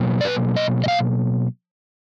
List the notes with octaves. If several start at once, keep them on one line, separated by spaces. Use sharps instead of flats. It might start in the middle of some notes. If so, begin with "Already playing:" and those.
Already playing: B2 F#3 A#3
D5
B4
D#5
D#5
F5